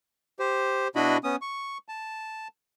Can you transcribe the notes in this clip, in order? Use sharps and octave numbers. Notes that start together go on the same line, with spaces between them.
G4 C5
B2 D4 E4 F#4 D#5 B5
B3 C#4 D#6
C#6
A5